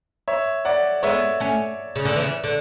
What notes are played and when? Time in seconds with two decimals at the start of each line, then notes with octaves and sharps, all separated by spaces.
0.28 C#5 E5
0.65 D5 F#5
1.03 G#3 B3 C#5 E5
1.40 A3 C#4
1.96 C#3
2.05 D3
2.16 C#3 E3
2.44 D3